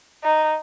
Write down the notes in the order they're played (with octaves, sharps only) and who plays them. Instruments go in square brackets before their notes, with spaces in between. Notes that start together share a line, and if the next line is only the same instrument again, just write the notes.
[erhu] D#4